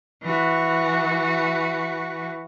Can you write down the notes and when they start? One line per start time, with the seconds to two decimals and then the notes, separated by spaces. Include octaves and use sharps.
0.22 E3 F#4